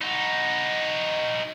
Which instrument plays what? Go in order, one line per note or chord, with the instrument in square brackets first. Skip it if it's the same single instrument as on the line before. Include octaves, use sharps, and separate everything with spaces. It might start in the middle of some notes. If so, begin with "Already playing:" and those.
[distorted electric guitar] D#4 F#4